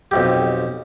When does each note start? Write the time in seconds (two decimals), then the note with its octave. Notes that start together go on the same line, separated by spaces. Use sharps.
0.11 B1 F2 G4